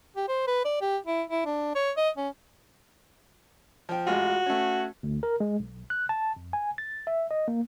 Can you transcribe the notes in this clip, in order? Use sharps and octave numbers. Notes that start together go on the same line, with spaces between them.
G4
C5
B4
D5
G4
E4
E4
D4
C#5
D#5
C#4
F3 G5
A1 G#3 F4 F#4
A3 C#4
D2
A#4
G#3
B1
F#6
A5
F2
G#5
A6
E5
D#5
A#3